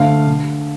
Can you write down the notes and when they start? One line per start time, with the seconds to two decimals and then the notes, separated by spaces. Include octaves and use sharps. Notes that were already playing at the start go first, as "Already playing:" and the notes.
Already playing: D2 D3 A3 F5
0.27 D3